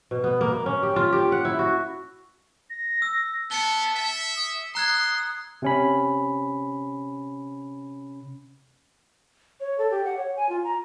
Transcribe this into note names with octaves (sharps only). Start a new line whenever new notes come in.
B2
B3
A#3
A#3
C#4
G4
F4
G4
F#5
E4
F#4
A#6
E6
B3 A5 C#7 G7
E5
D#6
A#5 C6 F#6 G#6
C3 C#4 B5
C#5
A4
G4
F#5
C#5
G#5
F4
A#5